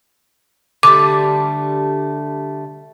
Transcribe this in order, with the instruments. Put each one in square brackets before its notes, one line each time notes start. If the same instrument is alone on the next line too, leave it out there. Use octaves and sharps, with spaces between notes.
[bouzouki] D3 G3 A3 [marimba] D6